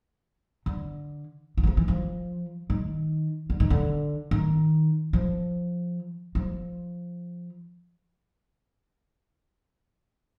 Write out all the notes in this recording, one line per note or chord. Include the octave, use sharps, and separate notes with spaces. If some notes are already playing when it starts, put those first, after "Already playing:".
D3
E3
F#3
F3
E3
F3
D#3
D3
D#3
D3
D#3
F3
F3